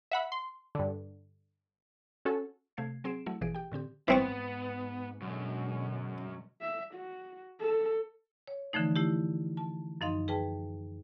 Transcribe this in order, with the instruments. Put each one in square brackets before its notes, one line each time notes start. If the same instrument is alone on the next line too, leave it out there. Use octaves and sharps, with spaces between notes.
[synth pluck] E5 F#5 B5
C6
G2 D3
C#4 F#4 A4
C3 A3 F5 G#6 C7
F#3 C4 G#4 C7 D7 E7
F#3 A3 E4
A1 B2 E3 F3 G#4 D7
G4 G5
A2 D3 C4 G4
[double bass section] G#2 [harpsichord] E3 C4 C#6 [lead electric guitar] B3
[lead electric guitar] F#2 [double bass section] B2 D3 G#3
[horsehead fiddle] E5
F#4
A4
[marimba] C#5
D3 E3 F3 A3 D#4
A3 E4 G4
A5
F#2 F3 D#4 D#5 F5 C6
G#4 B4 G5 A5